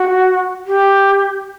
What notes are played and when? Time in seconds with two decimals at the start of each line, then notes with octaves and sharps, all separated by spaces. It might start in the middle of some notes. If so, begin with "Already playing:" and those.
Already playing: F#4
0.66 G4